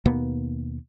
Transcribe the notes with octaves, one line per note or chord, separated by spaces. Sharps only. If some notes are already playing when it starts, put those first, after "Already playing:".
D#2 B2 A#3 B3